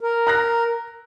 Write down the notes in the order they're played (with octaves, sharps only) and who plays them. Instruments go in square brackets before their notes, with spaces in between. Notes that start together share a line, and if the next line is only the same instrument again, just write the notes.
[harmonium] A#4
[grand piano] A#5 F#6 A#6